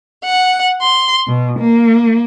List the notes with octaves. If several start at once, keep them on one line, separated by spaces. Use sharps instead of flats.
F#5
C6
B2
A#3